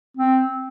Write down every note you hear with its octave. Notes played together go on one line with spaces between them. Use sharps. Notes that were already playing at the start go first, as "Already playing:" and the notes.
C4